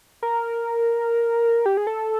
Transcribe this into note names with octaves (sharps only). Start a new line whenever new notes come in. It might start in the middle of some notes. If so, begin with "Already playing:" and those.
A#4
G4
G#4
A4